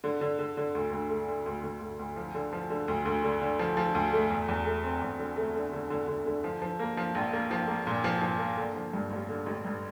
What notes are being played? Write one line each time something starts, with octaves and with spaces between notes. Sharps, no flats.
D3
D3
D3
D3
D2
D2
A3
D3
D2
D2
D2
D2
F3
D3
F3
D3
D2
D2
D3
D3
F3
F3
D2
A3
E2
E2
A3
C4
E2
D3
A3
D3
D3
D3
D3
D3
F3
F3
A#3
F3
A#1
A#3
F3
A#3
A#2
F3
F3
A#3
D3
F3
G2
A1
D3
A1
G2